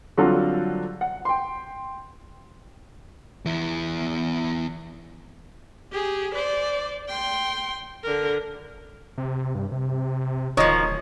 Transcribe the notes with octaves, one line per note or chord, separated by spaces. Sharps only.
D3 F#3 G3 C4 F4 A4
F#5
G5 C6
E2 E4
G4 G#4
C5 D5
G5 C6
D3 A#4
C3
G2
C3
D1 D#3 F3 C#5 D#5